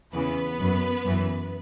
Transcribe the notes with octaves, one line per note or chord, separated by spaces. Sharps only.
E2 C#3 E3 B3 B4
F#2 F#3
F#2 E3